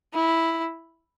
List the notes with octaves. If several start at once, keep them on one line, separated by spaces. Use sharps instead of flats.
E4